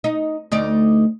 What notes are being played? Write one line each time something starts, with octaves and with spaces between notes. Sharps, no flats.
D#4
D2 D#4 D5